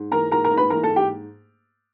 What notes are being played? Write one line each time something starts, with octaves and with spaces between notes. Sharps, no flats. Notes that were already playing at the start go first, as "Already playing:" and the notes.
Already playing: G#2
E3 A#4 A#5
G#2 A#4 A#5
A#4 A#5
G#2
B4 B5
E3 A#4 A#5
A4 A5
G#2
G4 G5